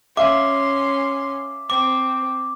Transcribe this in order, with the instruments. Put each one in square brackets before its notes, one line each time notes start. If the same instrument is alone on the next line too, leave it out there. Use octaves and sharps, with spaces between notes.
[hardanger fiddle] C#4 C6 [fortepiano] E5 F5 [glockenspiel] D6
[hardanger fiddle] C4 [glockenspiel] D6